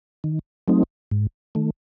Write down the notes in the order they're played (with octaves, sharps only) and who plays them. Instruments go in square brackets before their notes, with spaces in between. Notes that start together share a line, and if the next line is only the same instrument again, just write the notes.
[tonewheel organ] D#3
F#3 A3 C4 D#4
G#2
D#3 A3